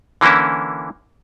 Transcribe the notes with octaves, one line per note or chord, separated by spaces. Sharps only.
D3 E3 A#3 C#4 E4